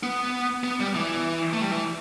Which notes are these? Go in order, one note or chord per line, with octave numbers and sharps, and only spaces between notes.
B3
B3
G3
E3
A3
G3
E3